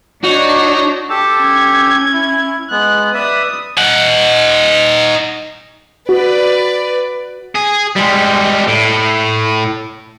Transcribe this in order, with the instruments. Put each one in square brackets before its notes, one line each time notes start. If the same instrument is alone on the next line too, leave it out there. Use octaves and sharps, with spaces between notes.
[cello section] D4 [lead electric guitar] D#4 [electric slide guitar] F#4 [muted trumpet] C#5
[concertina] G4 A4 [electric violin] A5
[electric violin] C#4 G#6
[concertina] E4
[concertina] G#3 B3 [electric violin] F#6
[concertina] B4 D5 E5 [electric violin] D#6
[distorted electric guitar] D#4 F#5
[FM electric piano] F#4 [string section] B4 D5
[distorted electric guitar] G#4
G3 G#3
A2